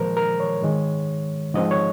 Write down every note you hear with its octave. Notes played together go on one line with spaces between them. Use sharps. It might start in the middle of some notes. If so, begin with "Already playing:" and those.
Already playing: A#2 F3 G#3 A#4 C5
A#4
C#5
G#2 D#3 G#3
G#2 F3 C4 D#5
C#5